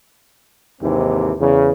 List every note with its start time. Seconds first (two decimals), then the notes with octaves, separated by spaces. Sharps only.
0.82 D#2 G#2 C3 E3 C4
1.39 E2 C#3